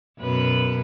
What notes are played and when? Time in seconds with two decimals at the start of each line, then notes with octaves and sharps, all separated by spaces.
0.19 F#2 B2 B4